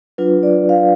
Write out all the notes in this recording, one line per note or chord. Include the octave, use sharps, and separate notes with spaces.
F#3 D4 F4 B4
D5
F5